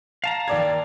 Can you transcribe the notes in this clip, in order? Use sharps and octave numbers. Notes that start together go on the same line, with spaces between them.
F5 A5 A#5
D#2 D5 G#6